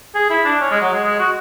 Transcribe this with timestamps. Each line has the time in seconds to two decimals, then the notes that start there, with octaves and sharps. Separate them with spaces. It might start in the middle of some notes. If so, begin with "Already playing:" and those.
0.15 G#4
0.30 E4
0.45 D4
0.60 C#4
0.71 G#3
0.81 F#3
0.93 G#3
1.05 G#3
1.19 F#4